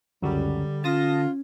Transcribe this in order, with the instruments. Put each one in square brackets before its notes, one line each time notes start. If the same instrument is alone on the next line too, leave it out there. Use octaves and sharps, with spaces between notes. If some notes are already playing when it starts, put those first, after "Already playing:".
[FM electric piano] C#2 F#2 F#3 [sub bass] D3 [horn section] G3
[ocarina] C#4 [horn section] F4 [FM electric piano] A5 D#6 A#6